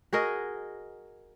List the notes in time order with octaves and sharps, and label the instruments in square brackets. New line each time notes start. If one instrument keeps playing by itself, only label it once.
[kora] F#4 G#4 A#4 D#5